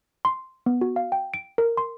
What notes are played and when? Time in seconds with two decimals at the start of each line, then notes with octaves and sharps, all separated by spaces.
0.25 C6
0.66 B3
0.81 F#4
0.96 F5
1.12 G5
1.34 D7
1.58 A#4
1.77 C6